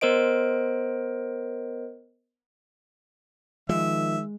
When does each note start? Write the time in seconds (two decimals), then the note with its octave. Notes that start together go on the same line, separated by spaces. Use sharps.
0.01 B3 A#4 C5 D#5 D7
3.69 D#3 F3 G#3 E5